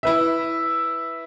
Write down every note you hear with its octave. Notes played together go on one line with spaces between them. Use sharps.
E4 B4 E5